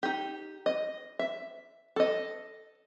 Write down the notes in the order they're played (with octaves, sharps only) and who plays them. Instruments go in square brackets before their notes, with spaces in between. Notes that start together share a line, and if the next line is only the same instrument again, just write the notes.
[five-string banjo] D#4 G4
D#5
E5
A4 D#5